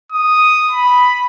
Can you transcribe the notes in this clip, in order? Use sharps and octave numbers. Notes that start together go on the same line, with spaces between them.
D#6
B5